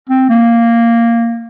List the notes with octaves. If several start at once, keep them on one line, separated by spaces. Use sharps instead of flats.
C4
A#3